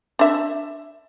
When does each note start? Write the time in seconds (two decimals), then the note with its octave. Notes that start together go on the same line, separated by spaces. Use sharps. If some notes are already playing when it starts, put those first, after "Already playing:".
0.19 D4 E5